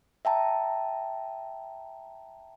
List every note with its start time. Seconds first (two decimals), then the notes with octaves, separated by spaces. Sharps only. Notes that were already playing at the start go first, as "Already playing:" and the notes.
0.25 E5 G5 A5 A#5